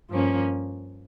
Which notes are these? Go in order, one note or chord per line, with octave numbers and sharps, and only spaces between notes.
G2 F3 A#3 C#4